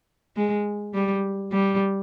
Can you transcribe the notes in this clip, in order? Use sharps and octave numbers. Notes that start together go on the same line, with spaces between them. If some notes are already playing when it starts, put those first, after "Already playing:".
G#3
G3
G3